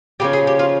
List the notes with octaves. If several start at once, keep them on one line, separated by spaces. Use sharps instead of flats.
C#3 F3 A#3 C#4 G4
G#4
G4
F4